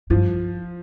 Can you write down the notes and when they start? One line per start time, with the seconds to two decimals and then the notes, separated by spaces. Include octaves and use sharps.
0.10 G2 F3